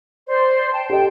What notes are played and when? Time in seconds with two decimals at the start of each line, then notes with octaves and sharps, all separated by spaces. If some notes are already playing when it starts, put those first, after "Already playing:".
0.28 C5 D5
0.73 G5 A5
0.89 G4 A4 D#5 G5